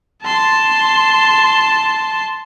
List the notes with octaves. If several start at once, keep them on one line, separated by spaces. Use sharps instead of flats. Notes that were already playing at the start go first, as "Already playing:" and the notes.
A5 C6